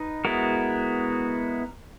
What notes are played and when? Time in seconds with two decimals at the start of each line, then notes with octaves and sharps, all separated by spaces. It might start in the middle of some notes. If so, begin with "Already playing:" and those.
Already playing: D#4 B4
0.25 G#3 B3 E4 F#4 A#4